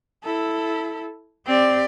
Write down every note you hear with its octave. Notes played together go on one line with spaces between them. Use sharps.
E4 A4
C4 G4 D5